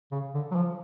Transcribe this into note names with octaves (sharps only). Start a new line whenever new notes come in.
C#3
D3
F#3
F3